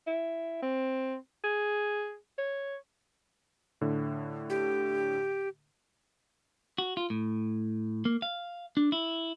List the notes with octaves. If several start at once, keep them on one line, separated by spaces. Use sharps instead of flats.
E4
C4
G#4
C#5
A2 D3
G4
F#4
F4
A2
A#3
F5
D4
E4